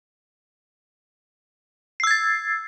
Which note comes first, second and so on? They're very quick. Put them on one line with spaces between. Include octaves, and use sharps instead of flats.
C7 E6 G#6 A6